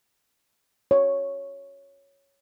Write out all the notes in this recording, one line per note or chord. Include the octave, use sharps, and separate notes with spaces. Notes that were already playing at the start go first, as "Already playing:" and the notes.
C#5